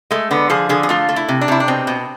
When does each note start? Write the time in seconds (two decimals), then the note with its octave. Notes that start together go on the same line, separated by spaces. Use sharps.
0.11 G#3 A3
0.31 D3 B3
0.50 F3 G#4
0.69 D3 G#4
0.83 G#4
0.89 A3 F4
1.09 A3
1.16 E4
1.29 C3
1.41 D4
1.48 C3 E4
1.60 D4
1.68 B2 C4
1.87 B2